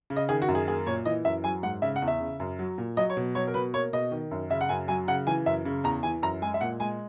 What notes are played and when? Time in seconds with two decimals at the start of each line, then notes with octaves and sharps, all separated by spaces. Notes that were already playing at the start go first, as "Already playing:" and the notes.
0.10 C#3
0.16 D#5
0.29 D#3 G#4
0.42 F#4
0.48 F#2
0.55 G#4
0.68 A#3 G#4
0.87 A#2 C#5
1.05 E3 D#5
1.25 F#2 E5
1.44 F#3 G#5
1.63 G#2 F#5
1.82 C#3 E5
1.96 F#5
2.02 E2
2.08 E5
2.20 C#3
2.40 F#2
2.59 F#3
2.78 A#2
2.97 F#3 D#5
3.10 C#5
3.17 B2
3.35 F#3 C#5
3.47 A#4
3.54 B2 B4
3.74 A#3 C#5
3.93 B2 D#5
4.12 D#3
4.31 F#2
4.50 C#3 E5
4.61 F#5
4.69 F#2 G#5
4.88 F#3 G#5
5.08 C#3 F#5
5.27 E3 G#5
5.46 F#2 E5
5.65 C#3
5.84 E2 A#5
6.03 E3 G#5
6.22 F#2 A#5
6.42 G#3 G#5
6.54 E5
6.61 A#2 F#5
6.80 G#3 G#5